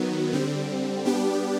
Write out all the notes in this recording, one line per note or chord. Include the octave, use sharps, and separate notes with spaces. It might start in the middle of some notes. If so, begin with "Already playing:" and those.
Already playing: D#3 F#3 B3
D3 G3 C4
G3 B3 D4 G4